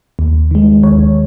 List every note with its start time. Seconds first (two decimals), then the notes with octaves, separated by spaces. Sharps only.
0.19 D#2
0.51 D#3 G#3
0.83 D#2 C#5